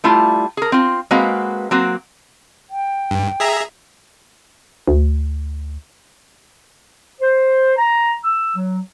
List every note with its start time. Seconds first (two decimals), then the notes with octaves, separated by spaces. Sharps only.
0.04 G3 A3 E4 F4
0.57 G#4 A#4
0.72 C4 F4
1.11 G#3 A#3 C4 F#4 B4 F5
1.71 F#3 A#3 C4 F#4
2.70 G5
3.11 G2
3.40 G#4 E5 A#5
4.88 D2
7.20 C5
7.77 A#5
8.24 E6
8.55 F#3